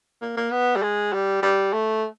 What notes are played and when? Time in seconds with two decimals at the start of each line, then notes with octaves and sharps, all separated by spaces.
0.22 A#3
0.37 A#3
0.52 B3
0.76 G3
0.82 G#3
1.13 G3
1.43 G3
1.73 A3